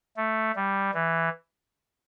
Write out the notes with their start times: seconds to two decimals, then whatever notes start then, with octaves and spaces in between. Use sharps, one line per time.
0.17 A3
0.56 G3
0.94 E3